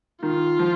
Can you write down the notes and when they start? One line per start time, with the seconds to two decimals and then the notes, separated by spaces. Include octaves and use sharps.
0.22 D#3 F4
0.59 F3